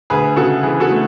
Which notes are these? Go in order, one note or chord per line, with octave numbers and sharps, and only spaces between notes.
D2 G#4 B4
C#3 F#4 A4
E3 G#4
F#4 A4
A3